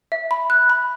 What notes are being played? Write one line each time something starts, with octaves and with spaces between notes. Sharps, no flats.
E5
B5
F#6
B5